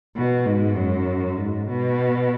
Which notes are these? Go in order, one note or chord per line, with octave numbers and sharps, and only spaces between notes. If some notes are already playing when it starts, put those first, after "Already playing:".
B2
G#2
F#2
G#2
B2